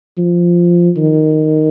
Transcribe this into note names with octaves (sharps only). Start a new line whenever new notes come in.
F3
D#3